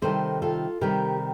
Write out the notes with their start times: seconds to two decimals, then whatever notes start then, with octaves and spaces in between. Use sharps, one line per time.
0.02 C3 D#3 G3 A4 C5
0.42 F4 A4
0.81 C3 D#3 G3 G4 A#4